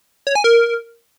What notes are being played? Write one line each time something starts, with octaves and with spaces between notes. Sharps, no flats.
C#5
G#5
A#4